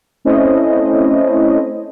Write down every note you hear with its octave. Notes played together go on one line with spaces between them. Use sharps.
A3 C4 C#4 E4 C5 D#5